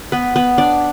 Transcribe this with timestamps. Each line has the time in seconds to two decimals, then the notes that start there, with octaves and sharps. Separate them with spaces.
0.12 B3 B4
0.36 B3 B4
0.58 D4 D5